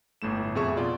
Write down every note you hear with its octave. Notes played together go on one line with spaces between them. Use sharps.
G1 A2 A3 E7
F2 B2 G#4 E5 C#6 E7
B2 F4 D5